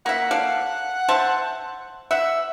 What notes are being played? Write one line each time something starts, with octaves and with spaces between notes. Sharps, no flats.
A#3 E5 F#5
A4 D5 F5
C5 E5 A5
E5 F#5